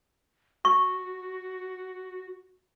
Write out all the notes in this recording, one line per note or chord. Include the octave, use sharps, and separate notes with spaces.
F#4 C#6